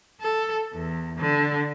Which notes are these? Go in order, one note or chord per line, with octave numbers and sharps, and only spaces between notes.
A4
E2
D3